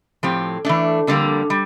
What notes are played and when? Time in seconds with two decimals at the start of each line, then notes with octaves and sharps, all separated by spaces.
0.23 A2 F3 C4 G4
0.65 E3 A3 D4
1.07 F2 D3 G3 A#3
1.50 G3